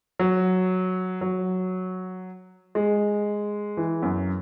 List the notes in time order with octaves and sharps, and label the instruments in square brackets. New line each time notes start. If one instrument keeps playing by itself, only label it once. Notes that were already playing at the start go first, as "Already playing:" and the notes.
[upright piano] F#3
F#3
G#3
E3
F#2